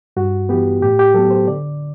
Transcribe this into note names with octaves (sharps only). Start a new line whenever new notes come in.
G2 F#4
E3 B3 G4
A2 G4
G4
F#3 B3 A4
C5
D3 D5